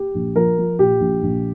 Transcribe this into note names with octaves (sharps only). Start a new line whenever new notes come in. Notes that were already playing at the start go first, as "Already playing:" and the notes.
Already playing: G4
A#1
F3 A#4
F3
A#2 G4
A#1
A#1